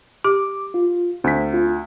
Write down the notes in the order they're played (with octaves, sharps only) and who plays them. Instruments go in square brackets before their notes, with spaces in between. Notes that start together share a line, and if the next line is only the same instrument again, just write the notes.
[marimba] G4 [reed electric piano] D6
[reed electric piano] F4
[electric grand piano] D2 B6 [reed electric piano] C4
[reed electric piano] F4